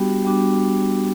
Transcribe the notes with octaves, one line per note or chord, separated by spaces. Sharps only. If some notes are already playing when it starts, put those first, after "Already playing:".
Already playing: G3 B3 D4 F#4 G4
G3 B3 D4 F#4